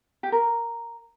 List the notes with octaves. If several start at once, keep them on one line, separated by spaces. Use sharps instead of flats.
G4
A#4